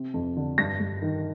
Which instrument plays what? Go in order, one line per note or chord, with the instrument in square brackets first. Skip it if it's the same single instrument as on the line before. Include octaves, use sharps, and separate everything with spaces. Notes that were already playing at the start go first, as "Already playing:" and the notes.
Already playing: [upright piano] C3 C4
F2
D3
G2 A#6
G2
D#3